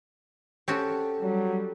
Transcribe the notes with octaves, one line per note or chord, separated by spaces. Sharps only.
C4 C#4 F#4 G4 A4
F#3 G3